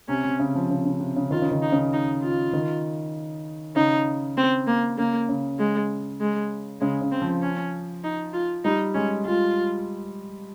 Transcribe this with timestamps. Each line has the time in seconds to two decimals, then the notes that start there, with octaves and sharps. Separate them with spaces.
0.09 C3 C#4
0.24 C3
0.40 C#3
0.55 F3
0.71 C#3
0.85 C#3
1.01 C3
1.16 C#3
1.31 D#3 F4
1.42 C#3
1.52 D#3
1.62 D#4
1.72 C#3
1.93 D#4
2.23 F4
2.53 D#3
3.76 C#3 D#4
4.37 C4
4.67 A#3
4.98 C#3 A#3
5.29 C#3
5.59 G#3
6.20 G#3
6.81 C#3 G#3
7.01 C#3
7.12 C4
7.22 F3
7.42 C#4
8.04 D#4
8.33 F4
8.64 G3 D#4
8.95 G#3 C#4
9.25 G#3 F4